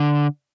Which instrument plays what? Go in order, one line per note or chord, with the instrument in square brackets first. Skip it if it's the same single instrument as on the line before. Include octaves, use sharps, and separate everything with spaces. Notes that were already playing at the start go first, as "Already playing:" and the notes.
Already playing: [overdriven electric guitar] D3